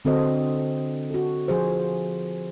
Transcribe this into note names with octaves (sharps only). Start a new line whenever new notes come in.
D3 C4 F#4 A4 C5 D#5
F#4 A4
F3 G#4 C5